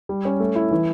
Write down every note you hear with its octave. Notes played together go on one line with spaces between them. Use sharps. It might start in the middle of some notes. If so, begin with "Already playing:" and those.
G3
C#4
A3
E4
E3